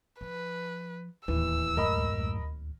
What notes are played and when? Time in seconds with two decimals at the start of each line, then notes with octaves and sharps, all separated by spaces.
0.21 F3 B4
1.28 D1 D#2 E3 E6
1.77 F#2 A2 G#3 A#4 D#5 B5